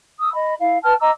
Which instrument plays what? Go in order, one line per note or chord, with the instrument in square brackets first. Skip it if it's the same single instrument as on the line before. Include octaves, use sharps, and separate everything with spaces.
[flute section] D#6 E6
D#5 B5
E4 F5
B4 G5 A5 F6
D#5 A#5 D6 E6